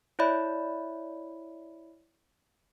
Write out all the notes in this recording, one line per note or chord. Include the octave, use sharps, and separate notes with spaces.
E4 C#5 D5 E5 B5